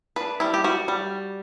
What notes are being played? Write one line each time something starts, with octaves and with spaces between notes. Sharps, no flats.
D4 B4
G3 E4
G4
G3 F#4
G3